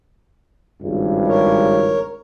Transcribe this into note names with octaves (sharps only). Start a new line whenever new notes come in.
G#1 C#2 G2
A#4 C#5